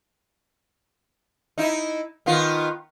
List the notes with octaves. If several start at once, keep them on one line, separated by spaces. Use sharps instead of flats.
D#4 E4
D#3 B3 F4